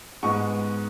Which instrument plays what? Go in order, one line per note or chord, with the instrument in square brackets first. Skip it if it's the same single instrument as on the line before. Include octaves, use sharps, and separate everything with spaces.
[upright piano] G#2 G#3 B3 C#6